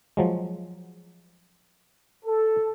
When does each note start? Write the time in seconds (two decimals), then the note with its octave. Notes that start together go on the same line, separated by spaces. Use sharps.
0.17 F3 F#3 G#3
2.25 A4